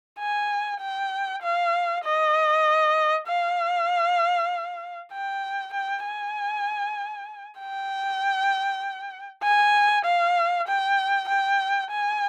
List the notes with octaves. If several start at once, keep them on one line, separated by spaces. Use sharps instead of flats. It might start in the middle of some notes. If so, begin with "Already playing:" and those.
G#5
G5
F5
D#5
F5
G5
G5
G#5
G5
G#5
F5
G5
G5
G#5